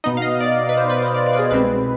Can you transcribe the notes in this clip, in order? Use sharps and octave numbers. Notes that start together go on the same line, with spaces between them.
B2 B3 D#4 D#5
F5
D#5
D5
B4
C5
B4
C5
D5
D5
B4
G#4
C2 B2 G#3 C4 B4